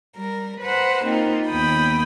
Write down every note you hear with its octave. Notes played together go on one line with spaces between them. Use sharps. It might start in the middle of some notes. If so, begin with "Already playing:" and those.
G3 A#4
B4 C5 F#5 A#5
A#3 C4 D#4 F4
D#2 B3 G5 B5 D#6